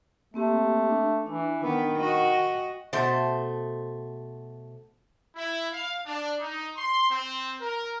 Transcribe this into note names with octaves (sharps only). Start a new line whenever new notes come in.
A3 A#3 C4 G4
D4
E3 D4
D#3 B3
F#4 D#5
G5
B2 A3 C5
E4
F5
D4
D#4
C6
C4
A#4